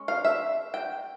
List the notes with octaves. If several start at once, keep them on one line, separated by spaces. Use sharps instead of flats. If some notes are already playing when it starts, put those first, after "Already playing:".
Already playing: G#3 C#4
F5
E5
G5